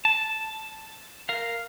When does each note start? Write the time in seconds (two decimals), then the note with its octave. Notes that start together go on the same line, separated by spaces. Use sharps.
0.05 A5
1.29 A#4 F5